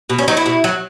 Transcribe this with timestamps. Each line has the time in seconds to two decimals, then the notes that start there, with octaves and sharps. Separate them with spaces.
0.10 B2
0.18 C#4
0.28 F#3 D#4
0.37 E4
0.46 B2
0.64 F#3